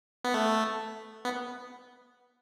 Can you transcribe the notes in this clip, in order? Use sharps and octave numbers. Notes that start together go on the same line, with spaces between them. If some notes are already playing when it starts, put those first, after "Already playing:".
B3
A3
B3